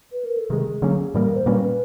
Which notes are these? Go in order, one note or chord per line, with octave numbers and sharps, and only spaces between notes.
B4
A#4
A4
C3 D#3 G#3 G#4
D3 F#3 A#3 C#4
A2 E3 G3 A#3 A#4
A#4
C5
A#2 G3 A#3 C#4 B4
B4